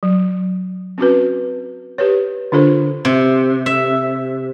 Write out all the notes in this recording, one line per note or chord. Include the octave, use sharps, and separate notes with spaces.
F#3
C4 C#4 F#4 B4
G4 B4 C#5
D3 D4 F4 A4 C5
C3
E5